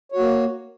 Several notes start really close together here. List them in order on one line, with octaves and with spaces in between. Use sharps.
C#5 F#4 A#3